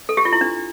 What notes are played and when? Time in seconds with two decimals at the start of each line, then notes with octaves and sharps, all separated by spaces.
0.09 A4
0.17 G4
0.25 F4
0.33 E4
0.41 D4